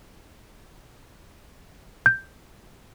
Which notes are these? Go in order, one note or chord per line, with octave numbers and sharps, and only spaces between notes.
G6